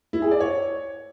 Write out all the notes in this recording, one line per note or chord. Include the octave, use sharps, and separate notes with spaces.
E4
G#4
D5
C#5